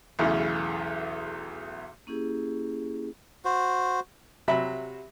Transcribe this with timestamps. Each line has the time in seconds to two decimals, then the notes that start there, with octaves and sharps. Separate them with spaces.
0.19 B1 E2 C#3 E3 A3
2.07 A#3 C#4 E4 G4 G#4
3.45 F#4 C5
4.48 C3 F#3 E5 B5